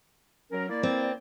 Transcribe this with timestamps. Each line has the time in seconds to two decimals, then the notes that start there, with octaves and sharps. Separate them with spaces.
0.51 F#3 C#4 A#4
0.69 A#3 E4 D5
0.83 C4